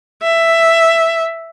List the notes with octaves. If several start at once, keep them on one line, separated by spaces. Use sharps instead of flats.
E5